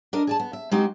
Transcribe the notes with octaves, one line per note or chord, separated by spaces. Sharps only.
D4 A#4 D#5
G#4 D5 A5
B3
E5
G#3 C4 D#4 F#4 G4 C5